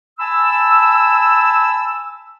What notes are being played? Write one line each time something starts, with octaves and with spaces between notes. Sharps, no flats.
G#5 A5 B5 E6